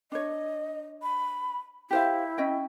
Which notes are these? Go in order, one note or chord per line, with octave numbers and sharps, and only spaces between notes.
D4 C#5 D#5
B5
E4 G4 C5 F5
C#4 D#5 G5